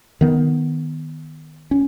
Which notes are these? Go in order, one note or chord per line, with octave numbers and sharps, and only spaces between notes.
D#3 B3
C#4